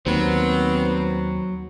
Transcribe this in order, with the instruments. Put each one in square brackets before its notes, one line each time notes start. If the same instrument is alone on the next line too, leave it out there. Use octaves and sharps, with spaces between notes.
[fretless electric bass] D#2 [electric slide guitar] F#3 [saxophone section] B3 C4